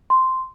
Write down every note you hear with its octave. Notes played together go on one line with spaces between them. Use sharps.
C6